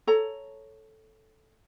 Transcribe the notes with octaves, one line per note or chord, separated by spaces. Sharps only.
A4 C#5 A#5